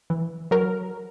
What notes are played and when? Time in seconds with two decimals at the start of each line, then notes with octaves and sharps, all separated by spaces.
0.10 E3
0.51 F#3 A#4